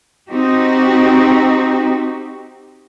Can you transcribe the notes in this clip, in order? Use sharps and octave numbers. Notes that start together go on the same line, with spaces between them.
C4 D#4 F#4 G4